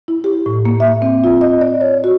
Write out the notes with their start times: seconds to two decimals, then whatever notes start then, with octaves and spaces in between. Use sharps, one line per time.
0.08 E4
0.24 G4
0.46 A2
0.65 A#3
0.80 E5
1.02 C4
1.24 F4
1.41 D#5
1.61 D5
1.81 C#5
2.04 F#4